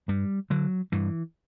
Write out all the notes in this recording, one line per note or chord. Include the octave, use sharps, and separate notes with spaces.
G2 G3
D3 F#3
G2 E3